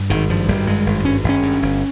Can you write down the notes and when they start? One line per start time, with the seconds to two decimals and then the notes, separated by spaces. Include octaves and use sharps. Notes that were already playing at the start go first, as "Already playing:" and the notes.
Already playing: G2
0.10 G#1 D#3
0.29 G2 F3
0.48 G#1 G3
0.67 G2 G#3
0.86 G#1
1.05 G2 C#4
1.24 G#1 C#4
1.43 G2
1.62 G1